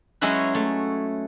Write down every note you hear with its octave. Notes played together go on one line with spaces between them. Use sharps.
F#3 G#3 C#4 E4 F#4 B4
A3